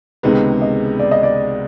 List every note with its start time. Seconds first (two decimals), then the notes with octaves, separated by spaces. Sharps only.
0.23 C#2 C3 D#3 G#3 B3
0.62 D#5
0.99 D5
1.11 D#5
1.23 D5